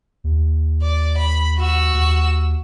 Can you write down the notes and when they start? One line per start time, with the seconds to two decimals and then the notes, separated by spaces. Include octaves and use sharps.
0.24 D#2
0.82 D5
1.17 B5
1.58 F#4 E6
1.94 D#2